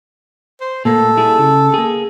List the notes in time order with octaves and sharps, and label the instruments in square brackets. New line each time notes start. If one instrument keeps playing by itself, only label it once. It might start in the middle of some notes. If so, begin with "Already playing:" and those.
[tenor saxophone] C5
[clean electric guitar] A#2 A3 A#3 [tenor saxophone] A4
[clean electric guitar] G3 E4 G#4
C#3
A#3 G#4